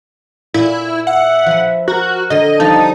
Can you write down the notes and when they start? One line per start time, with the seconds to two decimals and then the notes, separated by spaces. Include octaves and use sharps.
0.54 A#2 E4
1.07 E5 F#5
1.46 F3 B4
1.88 F#4 A#4
2.30 D3 A4 D#5 C6
2.60 F3 G3 A#3 D#4 D#5 A5